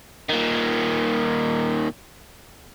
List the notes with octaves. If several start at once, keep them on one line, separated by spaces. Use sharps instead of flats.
A#2 D#3